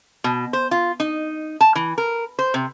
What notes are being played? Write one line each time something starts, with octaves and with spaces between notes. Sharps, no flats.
B2
C5
F4
D#4
A5
E3
A#4
C5
C3